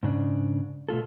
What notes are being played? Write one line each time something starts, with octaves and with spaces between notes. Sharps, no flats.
G#2 C#3 D4
B2 A3 F4 A4